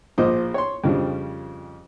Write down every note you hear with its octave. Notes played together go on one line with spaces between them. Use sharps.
A#1 F3 A#3 C5 D#5 D6
C#5 C6
F2 C#3 F3 G3 D4